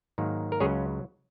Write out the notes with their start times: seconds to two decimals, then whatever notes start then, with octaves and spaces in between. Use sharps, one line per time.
0.18 G#2 D#3 F#3 A#3
0.52 A#4
0.60 C#2 C#3 F#3 C#4 G#4 C#5